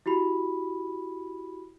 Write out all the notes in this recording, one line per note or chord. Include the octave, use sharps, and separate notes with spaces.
E4 F#4 G4 B5